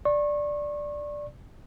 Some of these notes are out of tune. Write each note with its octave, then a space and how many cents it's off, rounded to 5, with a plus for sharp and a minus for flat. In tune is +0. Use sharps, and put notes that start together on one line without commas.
D5 +0 C#6 -30